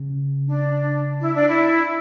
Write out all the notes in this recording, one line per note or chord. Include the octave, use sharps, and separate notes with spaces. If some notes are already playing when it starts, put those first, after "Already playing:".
Already playing: C#3
D4
E4
D4
E4